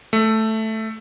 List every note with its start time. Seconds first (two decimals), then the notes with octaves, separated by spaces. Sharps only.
0.13 A3